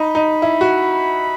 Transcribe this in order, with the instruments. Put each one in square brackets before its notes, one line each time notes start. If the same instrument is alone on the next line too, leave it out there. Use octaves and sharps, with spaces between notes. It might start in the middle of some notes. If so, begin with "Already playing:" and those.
Already playing: [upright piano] D#4 [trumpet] B5
[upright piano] D#4
E4
F#4